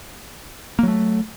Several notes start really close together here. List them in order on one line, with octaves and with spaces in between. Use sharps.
A#3 F#3 A3